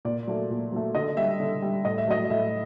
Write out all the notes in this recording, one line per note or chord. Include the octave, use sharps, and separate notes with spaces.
A#2 D5
F#3 A3
A#2
F#3 A3
D3 D#5
G3 E5
D3
G3
A2 D#5
E5
F#3 A3 D#5
A2 E5